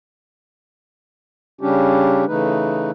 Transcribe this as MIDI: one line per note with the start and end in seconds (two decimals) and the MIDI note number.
1.61 2.25 49
1.61 2.25 55
1.61 2.25 61
1.61 2.25 62
1.61 2.25 67
2.27 2.91 49
2.27 2.91 52
2.27 2.91 57
2.27 2.91 63
2.27 2.91 71